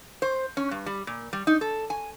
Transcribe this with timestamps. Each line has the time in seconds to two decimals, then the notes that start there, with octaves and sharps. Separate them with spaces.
0.22 C5
0.57 C#4
0.71 G2
0.86 G3
1.07 A#2
1.33 G3
1.47 D#4
1.61 A4
1.90 G#5